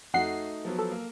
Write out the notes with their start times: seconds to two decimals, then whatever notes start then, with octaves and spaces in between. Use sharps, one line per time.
0.14 F2 A3 D#4 F#4 F#5 C7
0.65 F3 F#3 B3
0.79 A4
0.91 A#3